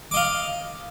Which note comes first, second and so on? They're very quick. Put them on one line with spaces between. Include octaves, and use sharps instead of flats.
D6 D#5 F5